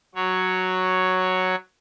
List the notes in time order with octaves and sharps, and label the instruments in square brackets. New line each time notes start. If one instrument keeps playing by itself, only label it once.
[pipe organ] F#3 C#5